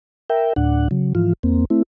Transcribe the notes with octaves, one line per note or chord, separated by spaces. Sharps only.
A#4 E5 G5
D2 A2 D4 F#5
C#3 F#3
G#2 E3 F3 F4
E2 A#3 C4
A3 C4 E4